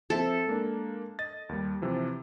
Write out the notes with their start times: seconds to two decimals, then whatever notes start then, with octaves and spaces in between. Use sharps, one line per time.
0.10 F3 C4 A4 E5
0.47 G#3 A#3 D4
1.19 D#5 A6
1.49 D#2 G3
1.82 C3 E3 F3